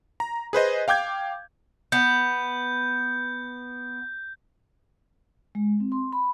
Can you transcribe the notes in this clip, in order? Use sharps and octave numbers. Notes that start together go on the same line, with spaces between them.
A#5
G#4 B4 C5 D#5
F5 G5 D6 G6 G#6
B3 G6
G#3
C4
C6
B5